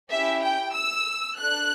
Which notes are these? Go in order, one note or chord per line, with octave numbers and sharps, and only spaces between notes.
C#4 E4 G4 E5
G5
E6
D4 A4 F#6